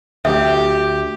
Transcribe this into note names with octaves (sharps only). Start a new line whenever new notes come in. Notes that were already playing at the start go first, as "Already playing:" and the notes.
D2 G4 E5